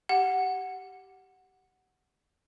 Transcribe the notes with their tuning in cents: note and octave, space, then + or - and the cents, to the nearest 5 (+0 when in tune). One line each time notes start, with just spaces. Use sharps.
G4 -10 F#5 +0